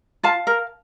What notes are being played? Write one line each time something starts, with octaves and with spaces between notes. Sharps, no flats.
F4 F5 A5
A#4